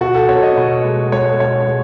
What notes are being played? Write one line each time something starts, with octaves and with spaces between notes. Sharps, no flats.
B2 F#4
A4
B2 C#5
D#5
B2
G#3
G#3 C#5
B2 C#5
G#3